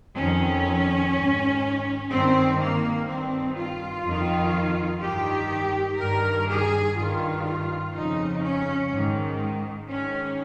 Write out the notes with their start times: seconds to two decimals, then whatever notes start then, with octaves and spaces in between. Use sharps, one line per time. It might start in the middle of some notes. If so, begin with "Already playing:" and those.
0.16 F2 D#3 C#4
1.13 G#2 D#3
2.10 G2 D#3 C4
2.60 A#3
3.08 G2 D#3 C4
3.56 F4
4.04 F2
4.10 D#3
5.02 G2 D#3 G4
5.99 G2 D#3 A#4
6.48 G#4
6.97 G2 D#3 F4
7.94 F2 C#3 D#4
8.43 C#4
8.91 G#2 D#3
9.88 G#2 D#3 C#4